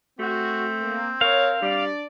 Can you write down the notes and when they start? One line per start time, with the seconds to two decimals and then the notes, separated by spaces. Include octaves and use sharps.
0.19 A3 C4 F#4
0.82 A#3
1.21 A#4 C#5 F5
1.62 G3 D4 D5